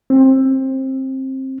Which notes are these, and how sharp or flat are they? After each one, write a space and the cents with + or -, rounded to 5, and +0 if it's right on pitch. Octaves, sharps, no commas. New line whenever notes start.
C4 +20